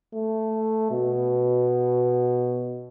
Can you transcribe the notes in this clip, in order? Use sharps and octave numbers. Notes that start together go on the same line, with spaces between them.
A3
B2